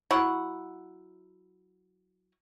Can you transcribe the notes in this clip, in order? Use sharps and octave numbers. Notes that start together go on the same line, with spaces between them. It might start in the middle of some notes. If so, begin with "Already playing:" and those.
F#3 E4 F#5 C#6